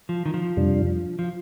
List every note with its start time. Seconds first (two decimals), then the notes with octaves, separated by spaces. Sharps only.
0.09 F3
0.26 D#3
0.34 F3
0.57 F2 C3 G3 D4
1.19 F3